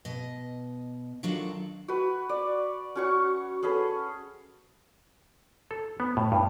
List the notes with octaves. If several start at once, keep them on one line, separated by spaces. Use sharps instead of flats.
B2 D#5
D#3 F#3 D4 F4 F#4 A4
F#4 B4
D5
C#4 F#4 C#6
C#4 G#4 A4 B4
A4
B3
A2
G2